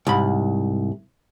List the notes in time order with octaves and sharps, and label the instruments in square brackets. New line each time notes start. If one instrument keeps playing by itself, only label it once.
[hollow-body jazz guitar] C2 G#2 B5